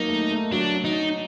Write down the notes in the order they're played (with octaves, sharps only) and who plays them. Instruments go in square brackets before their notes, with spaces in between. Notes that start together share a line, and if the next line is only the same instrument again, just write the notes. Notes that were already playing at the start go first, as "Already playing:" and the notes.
Already playing: [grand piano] F#3 A#3 [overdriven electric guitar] D#4
[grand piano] A3
A3
[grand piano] F#3 [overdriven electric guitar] D4
[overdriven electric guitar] D#4